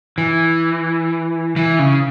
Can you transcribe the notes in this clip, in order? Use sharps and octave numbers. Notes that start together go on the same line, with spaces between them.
E3
E3
C#3